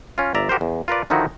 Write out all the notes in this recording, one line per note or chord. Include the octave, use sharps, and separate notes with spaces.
C#4 F4
G1 D5 E5 A#5
F#4 G4 A#4 C5
E2
F4 A#4 B4 D5
D3 D#3 F3 D#4 E4 F#4